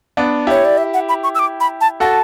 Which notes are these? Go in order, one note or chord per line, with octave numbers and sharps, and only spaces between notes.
B3 D4
E4 G4 C#5
D5
E5
F#5
B5
C#6
E6
D6
B5
A5
F#4 A4 A5